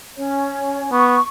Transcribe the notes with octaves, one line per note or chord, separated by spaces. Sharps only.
C#4 C#5
B3 C#6